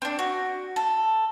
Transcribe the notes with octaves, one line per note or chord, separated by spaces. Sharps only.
C4 D4
F#4
A4